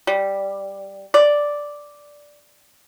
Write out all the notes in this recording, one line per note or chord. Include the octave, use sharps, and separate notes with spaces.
G3
D5